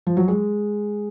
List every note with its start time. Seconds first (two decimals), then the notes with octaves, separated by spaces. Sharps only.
0.07 F3
0.17 F#3
0.28 G#3